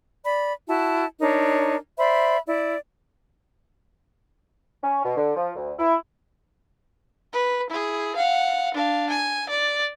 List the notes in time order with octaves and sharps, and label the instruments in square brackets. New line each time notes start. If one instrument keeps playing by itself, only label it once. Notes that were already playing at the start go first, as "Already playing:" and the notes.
[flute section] D5 B5
E4 F#4 A5
D4 D#4 A#4 C#5
C5 D5 E5 B5
E4 D5
[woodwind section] C#4
B2
D3
F3
D2
E4
[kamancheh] B4
E4 G#4
F5 F#5
D4 F5
G#5
D5